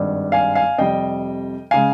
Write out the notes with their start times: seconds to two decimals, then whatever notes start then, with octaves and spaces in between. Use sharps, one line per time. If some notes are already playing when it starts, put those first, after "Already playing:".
Already playing: G#1 G2 G3
0.32 F5 G#5
0.55 F5 G#5
0.78 F2 C3 G3 D#5 G5
1.71 C#3 G#3 F5 G#5